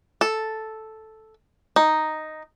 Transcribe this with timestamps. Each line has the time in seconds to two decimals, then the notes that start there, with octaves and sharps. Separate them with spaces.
0.21 A4
1.76 D#4